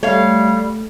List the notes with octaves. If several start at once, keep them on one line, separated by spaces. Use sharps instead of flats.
G3 A3 C#5 F5